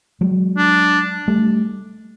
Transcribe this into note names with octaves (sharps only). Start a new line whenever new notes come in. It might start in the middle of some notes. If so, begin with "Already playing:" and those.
F#3 G#3
D4
G3 A3